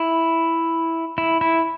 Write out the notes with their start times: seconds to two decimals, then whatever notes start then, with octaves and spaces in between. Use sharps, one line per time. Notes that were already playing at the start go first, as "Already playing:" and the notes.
Already playing: E4
1.18 E4
1.41 E4